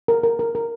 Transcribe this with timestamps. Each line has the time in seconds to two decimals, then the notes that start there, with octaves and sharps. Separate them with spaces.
0.08 A#4
0.23 A#4
0.39 A#4
0.55 A#4